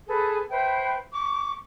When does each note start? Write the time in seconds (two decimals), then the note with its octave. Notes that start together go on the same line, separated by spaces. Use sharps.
0.08 G#4 A4 B4
0.50 B4 C5 E5 G5
1.13 C#6 D6